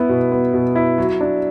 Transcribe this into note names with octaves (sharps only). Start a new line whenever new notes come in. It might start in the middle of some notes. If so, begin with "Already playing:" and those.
Already playing: B3 E4
B2
B3
B2
E4
F#3
D4